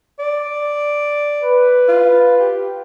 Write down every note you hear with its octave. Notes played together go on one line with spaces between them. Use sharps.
D5
B4
F4
G4